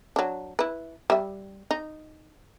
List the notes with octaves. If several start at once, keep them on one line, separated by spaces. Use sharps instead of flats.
F#3 D4
E4 B4
G3 E5
D#4